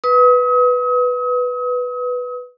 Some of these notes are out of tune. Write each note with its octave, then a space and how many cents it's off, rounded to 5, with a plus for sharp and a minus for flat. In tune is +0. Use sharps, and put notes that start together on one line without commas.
B4 +0 D#6 +40